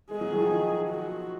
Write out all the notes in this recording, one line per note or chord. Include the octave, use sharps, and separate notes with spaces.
G#3 G#4
F#3
D#3
F3
D#3
F#4